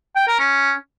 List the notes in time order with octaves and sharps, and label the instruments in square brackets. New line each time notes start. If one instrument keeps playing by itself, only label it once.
[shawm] G5
A#4
C#4